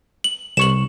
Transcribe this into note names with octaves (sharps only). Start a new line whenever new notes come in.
F#7
C2 C#6 E7 F#7